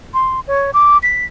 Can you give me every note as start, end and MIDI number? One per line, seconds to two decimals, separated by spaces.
0.14 0.40 84
0.47 0.71 73
0.74 0.98 86
1.03 1.25 95